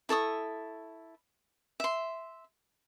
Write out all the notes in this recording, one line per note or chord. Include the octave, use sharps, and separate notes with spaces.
E4 A4 C#6 D#6
E5 C6